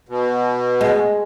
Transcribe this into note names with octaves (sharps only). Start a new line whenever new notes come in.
B2
G#3